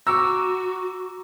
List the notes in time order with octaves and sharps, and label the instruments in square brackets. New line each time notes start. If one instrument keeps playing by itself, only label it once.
[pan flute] F#4 [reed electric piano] A#5 C#6 D6 [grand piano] E6